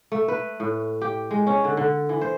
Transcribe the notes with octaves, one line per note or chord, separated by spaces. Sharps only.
A3
B4
A2
G4
G#3
C#4
D3
D3
E3
C5